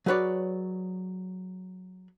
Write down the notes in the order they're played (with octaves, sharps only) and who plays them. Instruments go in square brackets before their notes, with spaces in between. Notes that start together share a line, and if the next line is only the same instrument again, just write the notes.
[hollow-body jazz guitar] F#3 G#4 B4 C#5 D5